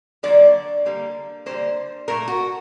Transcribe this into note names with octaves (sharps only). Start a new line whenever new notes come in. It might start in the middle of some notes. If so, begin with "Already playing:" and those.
D3 F#3 A#3 D5
D3 G3 A#3
D3 G3 A#3 C5
A#2 A3 A#4
F#4